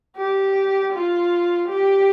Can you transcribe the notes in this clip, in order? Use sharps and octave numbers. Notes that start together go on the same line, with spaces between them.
G4
F4
G4